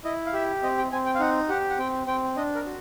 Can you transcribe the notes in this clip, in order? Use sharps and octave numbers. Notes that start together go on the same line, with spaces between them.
E4 D#5
F5
G4 E5
C4 D#5
G5
C4 G#5
G5
F5
D#4 F#5
G4 F#5
F#5
C4 G5
C4 G5
D4 D#5
A#4
F#4